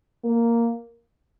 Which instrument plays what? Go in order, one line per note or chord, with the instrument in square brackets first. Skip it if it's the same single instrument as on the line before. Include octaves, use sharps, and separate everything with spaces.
[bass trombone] A#3